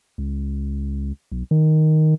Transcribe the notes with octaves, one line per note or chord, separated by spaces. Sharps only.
C#2
B1
D#3